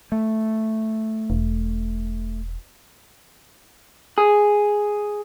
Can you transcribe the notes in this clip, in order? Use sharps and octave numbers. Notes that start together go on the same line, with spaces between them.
A3
E1
G#4